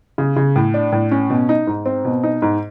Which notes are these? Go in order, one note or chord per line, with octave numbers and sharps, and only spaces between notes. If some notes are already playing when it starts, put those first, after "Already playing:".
C#3
C#3
A2
D4
A2
C#4
B2
D#4
G#2
C4
B2
D#4
G#2